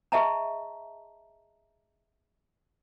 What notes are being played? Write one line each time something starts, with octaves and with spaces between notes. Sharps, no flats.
G#4 D#5 E5 A5 A#5